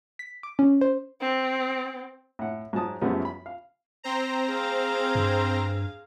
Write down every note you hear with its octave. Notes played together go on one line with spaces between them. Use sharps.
B6
D6
C#4
C5
C4
A2 F#5
G#2 F#3 A5 D#6
F#2 C#3 F3 G3 A3 B3
B5
F5
C4 C5 A#5
G#4 F5
G2